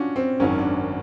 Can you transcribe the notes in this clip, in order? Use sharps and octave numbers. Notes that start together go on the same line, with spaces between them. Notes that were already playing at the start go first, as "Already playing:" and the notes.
Already playing: C#4 D4 F4 F#4
C4
G#1 F#2 D#3 C#4
D4